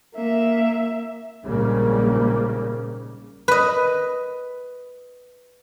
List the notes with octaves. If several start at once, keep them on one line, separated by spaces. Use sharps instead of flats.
A#3 E5
A#1 G#2 C#3 G3 A#3
B4 D#5